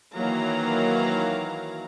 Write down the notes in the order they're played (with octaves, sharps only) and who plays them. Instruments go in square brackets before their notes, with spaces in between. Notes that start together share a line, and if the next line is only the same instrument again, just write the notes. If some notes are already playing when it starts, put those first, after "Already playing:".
[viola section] D#3 E3 F#3 A#3 F5 A#5